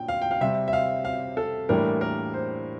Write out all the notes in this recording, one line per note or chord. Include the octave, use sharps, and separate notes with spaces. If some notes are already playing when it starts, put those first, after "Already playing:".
Already playing: A#2 D4 G5
F5
G5
F5
C3 G3 C4 E5
E5
F5
F5
A4
A2 E3 G3 A#3 D4 A#4
A#4
C5